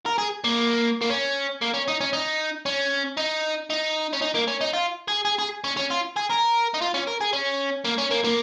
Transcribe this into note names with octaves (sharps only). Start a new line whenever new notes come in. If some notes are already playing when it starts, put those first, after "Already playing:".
A#4
G#4
A#3
A#3
C#4
A#3
C#4
D#4
C#4
D#4
C#4
D#4
D#4
C#4
D#4
A#3
C#4
D#4
F4
G#4
G#4
G#4
C#4
C#4
F4
G#4
A#4
D#4
F4
C#4
A#4
G#4
C#4
A#3
C#4
A#3
A#3